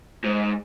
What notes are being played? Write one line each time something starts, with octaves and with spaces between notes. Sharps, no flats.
G#2